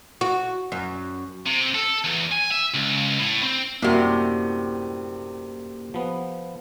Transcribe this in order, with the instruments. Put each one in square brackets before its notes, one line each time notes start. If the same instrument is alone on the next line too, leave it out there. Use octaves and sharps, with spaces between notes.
[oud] F#4
F#2
[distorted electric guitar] C3
A4
E2
G#5
E5
C#2
A2
C4
[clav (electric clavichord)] F#2 G3 F#4 [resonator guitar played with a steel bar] A2 C3 [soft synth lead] A#3
[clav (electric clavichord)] F3 B3